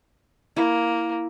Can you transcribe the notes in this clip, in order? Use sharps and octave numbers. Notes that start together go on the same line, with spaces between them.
A#3 E4